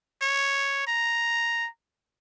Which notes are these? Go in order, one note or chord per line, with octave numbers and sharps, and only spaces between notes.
C#5
A#5